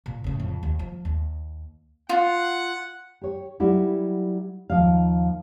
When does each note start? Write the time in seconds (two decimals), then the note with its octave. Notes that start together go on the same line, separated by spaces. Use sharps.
0.06 A#2
0.24 A2 C#3
0.40 F2
0.63 D#2
0.79 F3
1.05 D#2
2.09 F4 F#5
3.21 G4 C#5
3.60 F#3 G3 E4
4.70 D#2 F3 F5